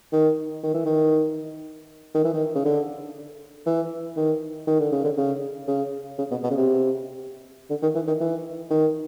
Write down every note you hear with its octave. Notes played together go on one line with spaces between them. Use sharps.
D#3
D#3
E3
D#3
D#3
E3
D#3
C#3
D3
E3
D#3
D#3
D3
C#3
D3
C#3
C#3
C#3
B2
B2
C#3
C3
D3
D#3
E3
D#3
E3
D#3